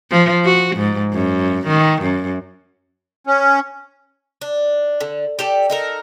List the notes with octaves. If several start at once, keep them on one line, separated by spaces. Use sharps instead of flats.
F3
F#4
G#2
F#2
D#3
F#2
C#4
D4
D3
G4 A4 D5
D#4 A4 A#4